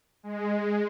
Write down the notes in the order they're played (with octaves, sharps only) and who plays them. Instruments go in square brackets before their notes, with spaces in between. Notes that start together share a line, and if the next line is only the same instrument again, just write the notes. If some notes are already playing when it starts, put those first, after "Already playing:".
[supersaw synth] G#3